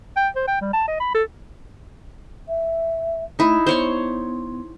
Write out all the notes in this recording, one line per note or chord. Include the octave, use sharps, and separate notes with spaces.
G5
C5
G5
G3
A5
D#5
B5
A4
E5
A3 D#4 E4
B3 C5 C#5 C6